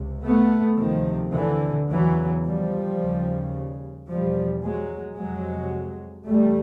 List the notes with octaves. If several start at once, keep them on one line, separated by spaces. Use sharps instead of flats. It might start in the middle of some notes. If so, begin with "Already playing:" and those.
Already playing: C#2 C3
A3 B3
D2 C3 D#3 F3
D3 E3
E2 C#3 E3 F#3
F3 G3
D#2 C#3
E2 B2 F3 G3
F#3 G#3
F2 C3 F#3 G#3
E2 C3 G3 A3